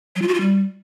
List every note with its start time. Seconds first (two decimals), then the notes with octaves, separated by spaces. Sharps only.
0.16 F#3
0.22 F4
0.28 F#4
0.34 F4
0.40 G3